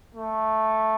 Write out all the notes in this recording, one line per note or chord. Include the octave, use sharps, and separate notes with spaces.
A3